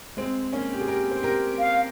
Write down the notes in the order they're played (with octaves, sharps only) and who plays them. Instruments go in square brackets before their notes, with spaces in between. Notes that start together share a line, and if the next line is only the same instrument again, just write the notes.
[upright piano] G#3 C4
A#3 C#4
G4
G#4
G4 A#4
C5
G4 A#4
[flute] F5